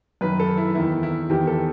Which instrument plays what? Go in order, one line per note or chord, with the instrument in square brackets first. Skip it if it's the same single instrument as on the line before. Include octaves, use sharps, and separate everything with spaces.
[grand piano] F#2 D#3 B4
A4
E4
E2 D#3 E4
E4
E2 D#3 G4
A4